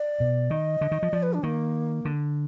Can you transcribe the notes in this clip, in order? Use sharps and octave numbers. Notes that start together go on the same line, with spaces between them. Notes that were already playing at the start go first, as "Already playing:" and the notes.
Already playing: D5
B2
D#3 D#5
D3
D#3
F3
F3 D5
B4
D4
D#3 A#3
D3